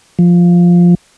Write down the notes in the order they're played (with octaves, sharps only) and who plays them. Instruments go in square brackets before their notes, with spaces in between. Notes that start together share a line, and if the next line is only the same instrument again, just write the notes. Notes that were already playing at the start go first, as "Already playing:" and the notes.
[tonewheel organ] F3